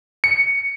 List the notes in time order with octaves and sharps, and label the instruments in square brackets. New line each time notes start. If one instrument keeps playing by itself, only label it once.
[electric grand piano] C#7